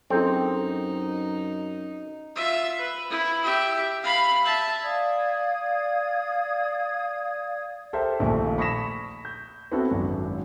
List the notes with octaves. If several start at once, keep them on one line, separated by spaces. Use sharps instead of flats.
F#2 C4 D#4 E4 G#4 A4
F4 E5
B4
E4
G4 E5
F5 B5
E5 A5
D5 F5 D#6 G#6
G4 A4 A#4 C5 E5
A#1 D#2 A#2 F3 A3
B5 C#6 D#6 A#6 B6 E7
G6
B3 C4 E4 F#4 A4
G#1 F#2